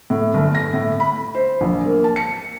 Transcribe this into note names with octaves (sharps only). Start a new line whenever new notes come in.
A2
G1
A#6
A2
B5
C5
A#1
A#3
A5
C#7